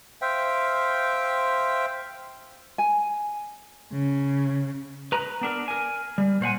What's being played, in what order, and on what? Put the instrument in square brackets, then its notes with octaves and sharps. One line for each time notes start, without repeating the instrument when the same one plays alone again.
[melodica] C5 E5 F5 G5
[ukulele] G#5
[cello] C#3
[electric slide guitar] B4 A#5
B3 D4 A#4
A#4 G#5
G3
A#2 C5 F#5 G#5